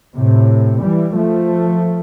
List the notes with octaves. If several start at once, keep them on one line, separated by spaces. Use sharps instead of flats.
A2 C3
E3 G3
F3 A3